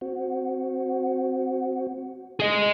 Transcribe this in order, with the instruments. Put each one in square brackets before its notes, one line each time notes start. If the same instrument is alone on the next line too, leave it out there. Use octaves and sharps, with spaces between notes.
[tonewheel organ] C4 F#4
[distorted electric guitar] G#4 D#5